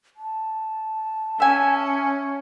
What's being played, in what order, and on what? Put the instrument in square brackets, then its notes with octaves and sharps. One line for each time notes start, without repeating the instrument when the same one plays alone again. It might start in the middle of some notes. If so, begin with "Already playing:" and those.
[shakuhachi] A5
[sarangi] C#4 [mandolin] E5 G#5